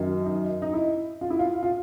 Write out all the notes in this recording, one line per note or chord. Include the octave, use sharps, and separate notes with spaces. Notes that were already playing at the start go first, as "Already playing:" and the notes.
Already playing: F#2 D#3 F#3
D#4
D#4
E4
F4
E4
F4
F4